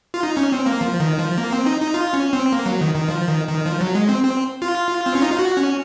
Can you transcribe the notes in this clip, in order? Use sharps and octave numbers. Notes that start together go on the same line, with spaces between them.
F4
D#4
C#4
C4
A#3
F3
D#3
F3
A#3
C4
D#4
D#4
F4
C#4
C4
A#3
F#3
D#3
D#3
F3
D#3
D#3
F3
F#3
G#3
C4
C4
F4
C4
C#4
D#4
F4
F#4
C#4